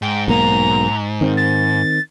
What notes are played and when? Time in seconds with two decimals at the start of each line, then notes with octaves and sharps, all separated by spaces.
0.02 G#2 G5
0.28 B1 A#3 A#5
1.21 D#3 C4
1.37 A6